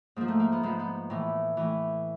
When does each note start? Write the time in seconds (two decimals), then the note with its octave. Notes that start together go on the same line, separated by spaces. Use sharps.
0.16 G#2 F3 A#3
0.28 A3
0.40 A#3
0.52 B3
0.63 G#2 F3 B3
0.80 B3
1.10 A2 E3 A3
1.57 A2 E3